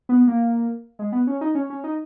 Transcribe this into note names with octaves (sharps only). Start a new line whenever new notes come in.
B3
A#3
G#3
B3
C#4
D#4
C#4
C#4
D#4